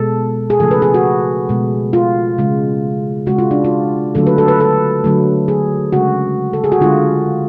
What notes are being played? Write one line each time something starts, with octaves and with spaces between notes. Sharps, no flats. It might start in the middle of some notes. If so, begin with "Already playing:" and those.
Already playing: B2 G#3 A4
G#4
C#3 F3 A3 A4
B4
G#4
F#4
B2 G#3
F4
C#3 G#3
C#3 G#3 F#4
F4
D4
F4
D3 F#3 A3 A4
B4
A4
B4
A4
D3 F#3 A3
G#4
C#3 G#3 F#4
A4
G#4
F#4
D3 G#3 F4